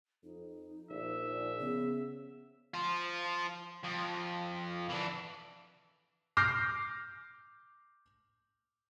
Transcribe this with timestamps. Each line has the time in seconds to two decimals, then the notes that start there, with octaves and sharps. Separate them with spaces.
0.24 F2 D#4
0.90 A#1 E5
1.60 C#3 B3
2.74 F4 C5
3.83 F2
4.89 E3 D4
6.37 D6 F6 G6 A#6 C7